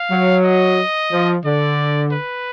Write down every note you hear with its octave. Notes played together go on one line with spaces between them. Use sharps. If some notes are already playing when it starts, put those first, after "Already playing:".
Already playing: F5
F#3
D#5
F3
D3 D5
B4